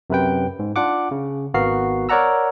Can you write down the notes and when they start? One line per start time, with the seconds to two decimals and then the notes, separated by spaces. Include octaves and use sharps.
0.10 F#2 C3 B4 G5
0.59 G#2
0.76 D4 F4 F#5 D6
1.11 C#3
1.54 G#1 B3 F#4 A#4 F5 C7
2.09 A#4 C#5 D5 F#5 A#5 E6